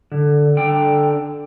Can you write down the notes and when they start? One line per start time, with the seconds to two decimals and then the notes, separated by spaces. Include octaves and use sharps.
0.12 D3
0.57 D3 G5